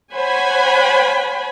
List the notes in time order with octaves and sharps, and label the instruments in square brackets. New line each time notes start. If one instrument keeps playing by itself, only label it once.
[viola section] C5 C#5 F#5 G#5 B5